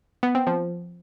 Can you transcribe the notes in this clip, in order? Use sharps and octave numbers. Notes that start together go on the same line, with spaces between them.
B3
C4
F3